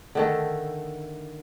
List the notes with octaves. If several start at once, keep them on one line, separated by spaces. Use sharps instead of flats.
D3 D#3 A3